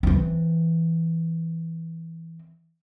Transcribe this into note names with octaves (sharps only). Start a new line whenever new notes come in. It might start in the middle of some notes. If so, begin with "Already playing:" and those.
E3 C4